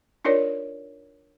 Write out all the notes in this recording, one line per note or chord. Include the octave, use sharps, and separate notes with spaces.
D4 D#4 F4 A#4 C#5 D5